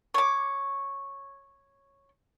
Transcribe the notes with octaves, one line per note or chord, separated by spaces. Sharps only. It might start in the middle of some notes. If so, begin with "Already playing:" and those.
C#5 D6